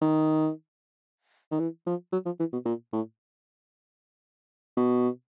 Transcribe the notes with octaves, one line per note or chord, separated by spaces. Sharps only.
D#3
D#3
E3
F3
F#3
F3
E3
B2
A#2
A2
B2